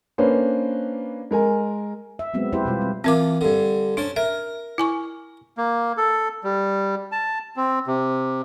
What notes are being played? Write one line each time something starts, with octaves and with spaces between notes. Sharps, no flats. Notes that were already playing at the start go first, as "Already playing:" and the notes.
A#3 C#4 D4 B4 C5
G#3 A#4 G#5
E5
F#3 G#3 B3 C4
E4 G4 B4 C5 D5
B2 G3 F4
G3 C4
E3 C4 F4 A#4 D6
G2 D3
C#4 D4 C5 A5
A#4 E5
E4 G#5 C#6
A#3
A4
G3
A5
C4
C3